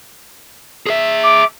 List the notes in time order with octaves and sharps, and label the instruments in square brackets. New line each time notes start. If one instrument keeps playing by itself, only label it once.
[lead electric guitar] G#4 E5
[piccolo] D6